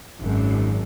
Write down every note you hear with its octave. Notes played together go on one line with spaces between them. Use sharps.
G#1 F#2